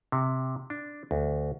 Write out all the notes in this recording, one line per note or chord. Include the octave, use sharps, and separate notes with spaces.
C3
D4
D2